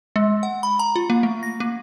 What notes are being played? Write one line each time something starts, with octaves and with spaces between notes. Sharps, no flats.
G#3
F#5
B5
A#5
F4
A#3
A3
A#6
A#3